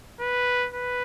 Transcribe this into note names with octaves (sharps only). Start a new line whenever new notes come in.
B4
B4